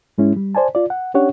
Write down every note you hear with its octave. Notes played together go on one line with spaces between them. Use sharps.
G#2 G#3 C#4 E4
G3
C5 D5 G#5 A5
F4 D5
F#5
C#4 D4 G4 C#5 F#5